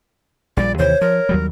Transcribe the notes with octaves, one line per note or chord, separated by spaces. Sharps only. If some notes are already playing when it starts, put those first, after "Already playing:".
A#1 A#2 G3 D5
D#2 C3 E3 C5 C#5
F3 A#4
D#2 F#3 G3